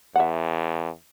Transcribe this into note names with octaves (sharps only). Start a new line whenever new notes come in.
E2 E5 F#5